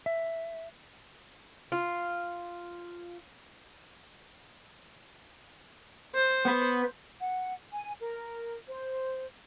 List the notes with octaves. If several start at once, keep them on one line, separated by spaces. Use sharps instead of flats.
E5
F4
C5
B3 B4
F#5
G#5
A#4
C5